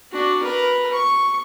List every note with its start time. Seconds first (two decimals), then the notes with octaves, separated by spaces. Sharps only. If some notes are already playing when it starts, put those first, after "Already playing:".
0.12 D4 F#4
0.43 A#4 B4
0.92 C#6